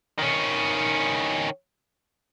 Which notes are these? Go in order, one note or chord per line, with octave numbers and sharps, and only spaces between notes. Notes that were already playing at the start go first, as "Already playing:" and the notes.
D#3 C#4